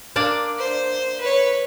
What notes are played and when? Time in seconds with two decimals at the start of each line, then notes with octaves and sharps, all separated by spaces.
0.16 A#3 D4 D5
0.58 C5
1.20 B4 C#5